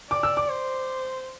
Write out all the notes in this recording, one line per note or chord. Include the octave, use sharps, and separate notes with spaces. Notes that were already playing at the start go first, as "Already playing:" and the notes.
D5 D6
E6
D6
C5